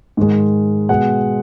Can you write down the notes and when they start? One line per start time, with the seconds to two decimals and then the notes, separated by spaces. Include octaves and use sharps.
0.17 G#2 D#3 G#3
0.89 B2 G#3 F#5